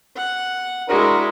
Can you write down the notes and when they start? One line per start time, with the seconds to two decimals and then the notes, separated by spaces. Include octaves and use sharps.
0.16 F#5
0.89 G#3 D4 E4 F#4 A#4